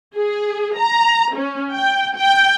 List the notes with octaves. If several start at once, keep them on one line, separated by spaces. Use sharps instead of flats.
G#4
A#5
C#4
G5
G5